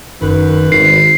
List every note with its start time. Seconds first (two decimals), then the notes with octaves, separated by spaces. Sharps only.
0.22 F#1 F#2 D#3 B4
0.72 G#1 D#3 C7